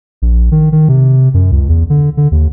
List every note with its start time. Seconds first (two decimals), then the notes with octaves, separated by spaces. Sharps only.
0.22 A#1
0.52 D#3
0.72 D#3
0.89 C3
1.34 F#2
1.51 C#2
1.69 E2
1.90 D3
2.17 D3
2.31 D#2